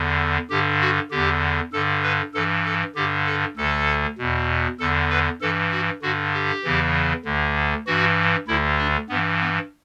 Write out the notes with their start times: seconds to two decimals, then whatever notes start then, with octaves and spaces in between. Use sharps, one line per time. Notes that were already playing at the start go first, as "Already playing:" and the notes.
Already playing: E2 D3
0.50 G2 D3 G4
0.81 F#4
1.11 E2 D3 G4
1.73 G2 D3 A4
2.03 B4
2.34 G2 E3 A4
2.65 A4
2.95 G2 D3 G4
3.26 A4
3.57 D2 D3 A4
4.18 E2 B2
4.79 E2 D3 A4
5.10 B4
5.41 G2 E3 A4
5.72 F#4
6.02 G2 D3 F#4
6.33 G4
6.64 E2 C#3 E3
7.25 D2 D3
7.86 G2 E3 F#4
8.48 D2 D3 E4
8.78 D4
9.09 G2 E3 B3
9.40 B3